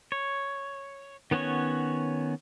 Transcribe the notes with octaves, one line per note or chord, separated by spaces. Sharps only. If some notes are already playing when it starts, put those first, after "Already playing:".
C#5
D#3 B3 C#4 F#4 C#5